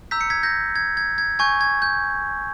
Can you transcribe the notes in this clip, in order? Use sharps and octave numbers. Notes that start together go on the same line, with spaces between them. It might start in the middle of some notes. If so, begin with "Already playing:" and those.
A#5 E6 G6 B6
C#7
G#6 B6
G6 A#6
G#6
G#6
G#6
G#5 C#6 G6 G#6
G#6
G6